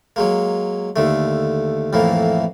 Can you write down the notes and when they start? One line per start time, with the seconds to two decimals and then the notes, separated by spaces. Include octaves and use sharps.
0.16 F#3 G#3 A#3
0.96 D#2 D3 A3
1.93 F2 A2 E3 A#3